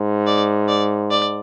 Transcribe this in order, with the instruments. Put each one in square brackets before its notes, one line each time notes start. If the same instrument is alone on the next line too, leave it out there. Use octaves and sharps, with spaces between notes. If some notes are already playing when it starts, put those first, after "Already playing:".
Already playing: [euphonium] G#2
[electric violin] D5
D5
D5